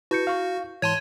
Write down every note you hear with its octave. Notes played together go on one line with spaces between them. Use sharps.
E4 F#4 B4 G6 C#7
F5 C#6
G#2 E3 C#5 A5 C6 G#6 D#7